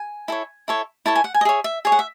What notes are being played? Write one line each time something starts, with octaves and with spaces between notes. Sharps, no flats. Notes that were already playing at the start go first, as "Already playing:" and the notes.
Already playing: G#5
E4 A4 C#5
E4 A4 C#5
E4 A4 C#5 A5
G#5
F#5
G#5
D#5
G#4 C#5 E5
E5
G#4 C#5 G#5
F#5
E5